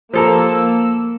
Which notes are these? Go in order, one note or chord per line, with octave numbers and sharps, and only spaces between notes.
F3 A#3 A4 A#4 E6